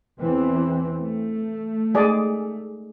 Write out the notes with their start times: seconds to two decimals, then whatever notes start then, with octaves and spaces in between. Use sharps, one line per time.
0.21 E2 E3 C4
1.00 A3
1.95 G#3 G#4 D5